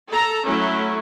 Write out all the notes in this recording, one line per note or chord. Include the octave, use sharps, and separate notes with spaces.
A4 A#5
F#3 A3 C#4 E4